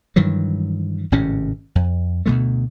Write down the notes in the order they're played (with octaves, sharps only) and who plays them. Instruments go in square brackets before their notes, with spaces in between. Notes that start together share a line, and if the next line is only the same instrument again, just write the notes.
[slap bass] G2 D#3 E3 F#3
G#1 A2 C3 C#4
F2
D2 B2 G#3 A3